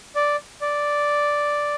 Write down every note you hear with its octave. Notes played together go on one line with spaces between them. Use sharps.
D5
D5